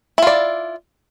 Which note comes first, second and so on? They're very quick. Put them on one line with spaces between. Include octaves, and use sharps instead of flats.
E4 F4 D5